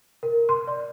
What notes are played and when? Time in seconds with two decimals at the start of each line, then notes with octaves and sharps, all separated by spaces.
0.23 A#4
0.49 C6
0.67 D5